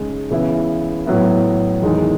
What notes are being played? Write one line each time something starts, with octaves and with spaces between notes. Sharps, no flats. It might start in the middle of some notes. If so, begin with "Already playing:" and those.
Already playing: C#3 G#3 D#4
C#3 E3 B3 E4
A2 F#3 B3 E4
E2 D#3 G#3 D#4